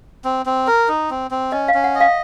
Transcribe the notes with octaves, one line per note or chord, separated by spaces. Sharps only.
C4
C4
A#4
D#4
C4
C4
C#4 D#5
F5
C#4
F#5
D#5
F5